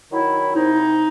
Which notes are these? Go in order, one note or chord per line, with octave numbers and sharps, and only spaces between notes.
D#3 F#3 E4
C3 D#4